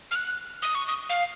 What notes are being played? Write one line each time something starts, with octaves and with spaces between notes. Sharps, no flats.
F6
F#6
D#6
C#6
D#6
F5